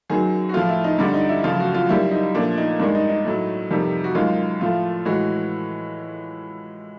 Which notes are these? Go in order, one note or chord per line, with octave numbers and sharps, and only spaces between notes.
F#2 D#3 F#3 G#4
F#4
A2 F3 A3 F4
E4
D#4
G2 D3 G3 D4
D#4
E4
F#2 C#3 F3 A3 F4
F#4
F4
F#2 D#3 G3 E4
D#4
A#2 F3 A3 D4
D#4
G2 D#3 G#3 D4
D#4
D#4
A2 F#3 A3
F2 C3 D#3 G3
F#4
F#2 D#3 G#3 F4
A2 F3 A3 F4
A2 E3 G#3 F#4